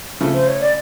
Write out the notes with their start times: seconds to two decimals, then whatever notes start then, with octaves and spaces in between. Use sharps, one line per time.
0.21 C#3 F3 A3
0.33 C5
0.47 C#5
0.60 D5